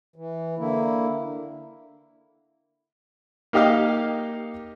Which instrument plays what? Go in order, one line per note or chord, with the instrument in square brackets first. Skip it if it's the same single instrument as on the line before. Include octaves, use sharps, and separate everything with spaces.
[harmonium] E3
D3 A#3 E4
[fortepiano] A#3 D#4 G4 D#5 F5